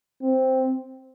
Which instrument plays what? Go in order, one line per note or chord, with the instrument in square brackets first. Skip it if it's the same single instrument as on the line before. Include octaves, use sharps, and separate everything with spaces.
[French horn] C4